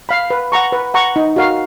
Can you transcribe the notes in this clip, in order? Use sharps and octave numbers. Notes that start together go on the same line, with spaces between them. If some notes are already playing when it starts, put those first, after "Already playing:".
F5 B5
B4
F#5 A#5 C#6
B4
F#5 A#5 C#6
D#4
F#4 A#4 F5